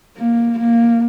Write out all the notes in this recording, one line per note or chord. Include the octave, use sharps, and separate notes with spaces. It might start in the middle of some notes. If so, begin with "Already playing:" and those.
A#3
A#3